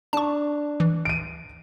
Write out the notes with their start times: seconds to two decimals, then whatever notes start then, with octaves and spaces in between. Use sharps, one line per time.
0.13 D4 A5 C#6
0.80 E3
1.05 D7 D#7